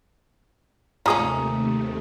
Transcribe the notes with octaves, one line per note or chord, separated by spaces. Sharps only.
D#2 C3 F3 G#3 A3 C#4 A#5 D#6